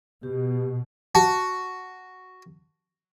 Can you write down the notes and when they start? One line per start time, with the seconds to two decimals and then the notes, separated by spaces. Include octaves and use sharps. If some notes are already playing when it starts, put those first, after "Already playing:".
0.23 B2 G4
1.15 F#4 A5